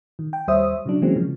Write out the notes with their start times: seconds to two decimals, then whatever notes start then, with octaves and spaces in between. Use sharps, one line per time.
0.19 D#3
0.33 G5
0.48 D#2 G3 C5 C#5 E5 D#6
0.86 C#3 F#3 D4
1.02 E3 F#3 G#3 A#3 C4 C#4
1.16 C#3 F3